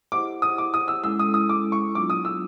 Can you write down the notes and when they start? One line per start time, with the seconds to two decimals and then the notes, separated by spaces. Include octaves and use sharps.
0.12 E4 G4 C5 D#5 F#5 D6
0.42 D#6
0.58 D6
0.74 D#6
0.88 E6
1.04 G#3 C#4 E4 A4 E6
1.19 D#6
1.34 D#6
1.49 D6
1.72 C#6
1.95 F#3 B3 D4 F4 D6
2.10 D#6
2.25 E6